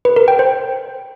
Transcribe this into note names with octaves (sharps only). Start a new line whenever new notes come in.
B4
A#4
G5
C5